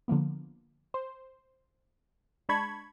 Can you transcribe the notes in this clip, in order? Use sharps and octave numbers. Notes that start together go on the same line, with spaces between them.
D3 F3 A#3 B3
C5
G#3 D4 A5 B5 C#6 G#6